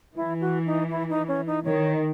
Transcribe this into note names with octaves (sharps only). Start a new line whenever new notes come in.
E3 E4
F#4
D#4
E4
D#4
C#4
D#4
D#3 C#5